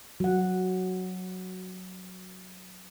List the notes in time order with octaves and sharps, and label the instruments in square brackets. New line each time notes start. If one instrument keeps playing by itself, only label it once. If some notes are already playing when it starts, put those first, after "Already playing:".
[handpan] F#3 F#5